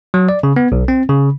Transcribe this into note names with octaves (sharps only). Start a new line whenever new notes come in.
F#3
D5
C#3
B3
B1
C4
C#3